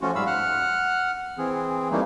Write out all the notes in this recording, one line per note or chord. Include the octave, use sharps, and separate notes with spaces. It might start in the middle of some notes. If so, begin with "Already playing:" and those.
F3 A3 C#4 F4 F#4
G#2 G3 F5 B5 E6
F#5 F6 F#6
E3 C4 G#4
E3 G3 A3 A#3 D#4